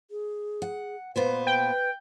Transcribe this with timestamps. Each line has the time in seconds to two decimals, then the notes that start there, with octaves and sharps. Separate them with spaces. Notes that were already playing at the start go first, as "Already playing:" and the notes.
0.11 G#4
0.62 F#5
1.16 A#2 B3 B4 C5
1.47 B4 G5